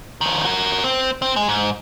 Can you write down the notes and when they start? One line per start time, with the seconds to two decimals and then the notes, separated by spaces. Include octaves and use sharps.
0.21 F2 D#3
0.45 F#4 A#4
0.84 C4
1.22 C4
1.36 G#3
1.49 G#2